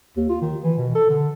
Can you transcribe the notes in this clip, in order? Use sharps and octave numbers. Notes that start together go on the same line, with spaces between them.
D#2
F4
D#3
E3
B2
A4
D3